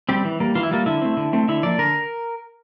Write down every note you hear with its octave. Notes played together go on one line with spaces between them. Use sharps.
G3 C4 G4
E3
G3 A#3
E3 F4
E4
G3 A#3 F4
D3 E4
A3 C4
D3
A3 C4
D3 E4
F3 A#3 D5
D3 A#4